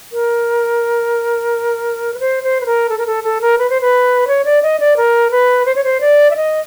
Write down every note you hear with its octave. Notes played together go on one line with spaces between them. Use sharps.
A#4
B4
C5
C5
B4
A#4
A4
A#4
A4
A4
A#4
B4
C5
B4
C#5
D5
D#5
D5
A#4
B4
C5
C#5
C5
D5
E5
D#5